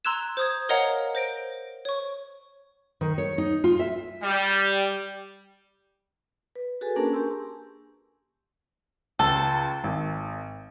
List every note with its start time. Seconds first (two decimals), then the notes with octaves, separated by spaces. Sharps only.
0.05 A#5 C6 E6 F#6 G#6 E7
0.37 C5 D#6 G#6
0.69 A#4 C#5 D#5 F5 F#5 A#5
1.15 C5 A#6 D7
1.85 C#5 C#6
3.01 D#3
3.18 C#5
3.38 D#4
3.64 F4
3.79 E5
4.23 G3
6.56 B4
6.81 F#4 G#4 A4 B4 G#5
6.96 A#3 C#4 D4 G#4 A#4 A5
7.13 G4 G#5 A5 C6 C#6 E6
9.19 C#2 A4
9.84 G#1